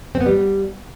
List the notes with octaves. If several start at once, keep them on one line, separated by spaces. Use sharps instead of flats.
C4
B3
G3